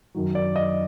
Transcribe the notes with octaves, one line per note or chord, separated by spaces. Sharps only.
F#2 D#3 F#3
D5
D#5